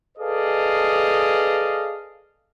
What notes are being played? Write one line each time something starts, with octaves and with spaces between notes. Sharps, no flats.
G#4 A4 B4 D5 D#5 F5